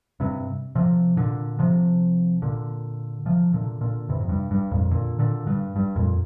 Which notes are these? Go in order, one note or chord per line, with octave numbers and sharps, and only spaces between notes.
G2 C3
C3 F3
A#2 D3
C3 F3
A#2 D3
C3 F3
A#2 D3
A#2 D3
G2 C3
F2
G2
G2
F2 A#2
A#2 D3
A#2 D3
G2
G2
F2 A#2